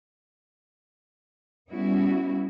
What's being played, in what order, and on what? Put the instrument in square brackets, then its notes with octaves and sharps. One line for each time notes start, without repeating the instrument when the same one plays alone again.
[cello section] G3 B3 C#4 E4 F#4